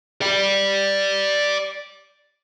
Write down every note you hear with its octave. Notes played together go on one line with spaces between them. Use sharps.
D5 G5